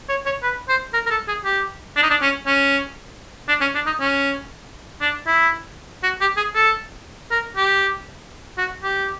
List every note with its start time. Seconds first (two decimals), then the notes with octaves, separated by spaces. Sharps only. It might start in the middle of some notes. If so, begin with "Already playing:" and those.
0.09 C#5
0.26 C#5
0.43 B4
0.69 C5
0.94 A#4
1.07 A#4
1.11 A4
1.28 G#4
1.44 G4
1.96 D4
2.03 D#4
2.10 D4
2.21 C#4
2.46 C#4
3.48 D4
3.61 C#4
3.75 D4
3.86 D#4
4.00 C#4
5.01 D4
5.27 E4
6.03 F#4
6.21 G4
6.37 G#4
6.55 A4
7.31 A#4
7.57 G4
8.58 F#4
8.83 G4